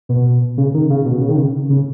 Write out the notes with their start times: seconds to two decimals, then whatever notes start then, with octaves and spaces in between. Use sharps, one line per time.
0.09 B2
0.57 C#3
0.74 D#3
0.90 C#3
1.05 B2
1.21 C#3
1.29 D#3
1.36 C#3
1.70 C#3